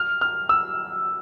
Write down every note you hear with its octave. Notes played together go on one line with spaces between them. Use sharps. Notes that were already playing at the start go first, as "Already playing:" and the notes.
Already playing: F6
F6
E6